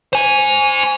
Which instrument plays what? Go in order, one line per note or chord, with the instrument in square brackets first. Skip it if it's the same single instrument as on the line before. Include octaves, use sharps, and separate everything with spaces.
[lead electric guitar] C5 G#5